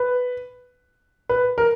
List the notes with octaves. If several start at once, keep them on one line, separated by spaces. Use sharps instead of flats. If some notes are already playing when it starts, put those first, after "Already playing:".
Already playing: B4
B4
A#4